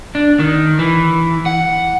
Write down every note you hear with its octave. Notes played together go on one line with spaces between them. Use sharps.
D4
D#3
E3
F#5